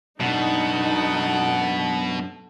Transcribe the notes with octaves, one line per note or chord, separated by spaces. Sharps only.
F#2 B2 D4 D#4 A4 F#5